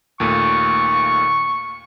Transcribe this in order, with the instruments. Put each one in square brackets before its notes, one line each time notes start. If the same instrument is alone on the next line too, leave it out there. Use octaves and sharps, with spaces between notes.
[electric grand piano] D#2 A#2 A3 [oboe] C#6